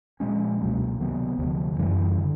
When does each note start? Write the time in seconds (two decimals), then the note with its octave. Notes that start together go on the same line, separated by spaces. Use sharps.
0.20 A#2 F3 G#3 C#4
0.60 C#2 B2 F#3 A#3
1.00 C3 D#3 F#3 B3
1.39 D2 C3 F3
1.79 F#2 C#3 E3 G3
2.21 D3